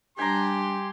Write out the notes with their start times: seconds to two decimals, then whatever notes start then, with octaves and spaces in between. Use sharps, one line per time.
0.18 G3 D4 G4 G#5 A#5 C6